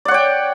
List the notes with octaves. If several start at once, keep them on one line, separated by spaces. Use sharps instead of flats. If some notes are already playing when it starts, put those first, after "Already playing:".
C#5 D5 F#5 G5